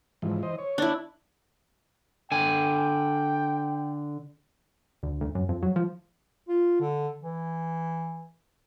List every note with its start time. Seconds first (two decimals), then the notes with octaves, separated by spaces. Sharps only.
0.22 G#2 E3 F3
0.43 E3 C5 D#5
0.58 C#5
0.78 D4 E4
2.32 D3 G5 G#5
5.03 D2
5.21 D2
5.35 F#2
5.49 F2
5.63 F#3
5.76 F3
6.48 F4
6.80 D3
7.23 E3